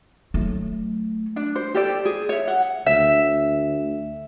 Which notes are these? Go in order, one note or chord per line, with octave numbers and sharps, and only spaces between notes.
F#3 A3
D4
C5
G4 A4 D5
G#4
C#5 E5
F#5
D2 E5